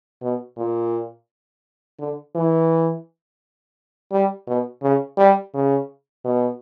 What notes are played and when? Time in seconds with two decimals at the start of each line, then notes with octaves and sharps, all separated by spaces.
0.22 B2
0.58 A#2
1.99 D3
2.35 E3
4.12 G3
4.47 B2
4.83 C#3
5.18 G3
5.54 C#3
6.25 B2